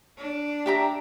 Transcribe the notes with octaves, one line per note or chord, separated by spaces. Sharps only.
D4
G4 E5 A#5